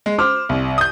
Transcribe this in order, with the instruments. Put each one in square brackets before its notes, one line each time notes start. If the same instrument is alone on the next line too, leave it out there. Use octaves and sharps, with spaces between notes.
[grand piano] G#3
[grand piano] C5 [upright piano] D6 F6
[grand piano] C2
D#6 G6